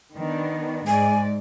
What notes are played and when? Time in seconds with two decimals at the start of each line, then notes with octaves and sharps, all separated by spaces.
0.15 D#3 B3 D4
0.87 G#2 G#3 D5 G#5